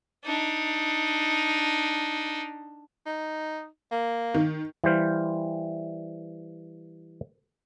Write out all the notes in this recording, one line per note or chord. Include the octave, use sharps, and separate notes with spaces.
D4 D#4
D#4
A#3
D#3
E3 G3 C5 F5